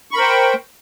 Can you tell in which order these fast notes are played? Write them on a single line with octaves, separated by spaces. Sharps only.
C#6 B5 A#4 C5 G5